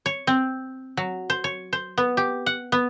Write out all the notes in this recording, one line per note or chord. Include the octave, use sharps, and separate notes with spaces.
C#5
C4
F#3
C5
C#5
C5
B3
G4
F#5
B3